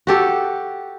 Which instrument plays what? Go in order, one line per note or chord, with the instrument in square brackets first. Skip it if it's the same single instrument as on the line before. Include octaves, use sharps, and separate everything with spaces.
[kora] F#4 G4 A4